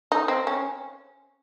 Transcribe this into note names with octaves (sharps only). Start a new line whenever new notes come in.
D#4
C4
C#4